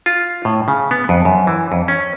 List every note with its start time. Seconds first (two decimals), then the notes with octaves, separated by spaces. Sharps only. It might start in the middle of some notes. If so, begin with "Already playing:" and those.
0.06 F4
0.45 A2
0.68 C#3
0.91 B3
1.09 F2
1.25 F#2
1.47 E3
1.72 F2
1.88 C#4